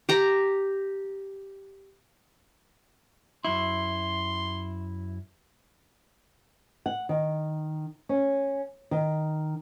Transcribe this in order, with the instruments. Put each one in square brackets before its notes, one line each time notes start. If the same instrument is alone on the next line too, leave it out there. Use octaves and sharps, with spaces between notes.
[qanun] G4 A#5
[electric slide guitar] F#2 E4 [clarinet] C6
[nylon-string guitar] F#5
D#3
C#4
D#3